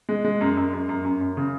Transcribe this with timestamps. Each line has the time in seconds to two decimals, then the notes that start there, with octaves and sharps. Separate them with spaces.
0.09 G#3
0.25 G#3
0.41 F#2
0.57 F#2
0.73 F#2
0.89 F#2
1.05 F#2
1.21 F#2
1.37 C#3